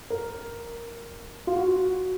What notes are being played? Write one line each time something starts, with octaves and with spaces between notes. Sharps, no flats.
A#4
F4
F#4